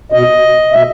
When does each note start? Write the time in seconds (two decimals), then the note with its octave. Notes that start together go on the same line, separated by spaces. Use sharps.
0.12 B2 D#5
0.72 B2 E5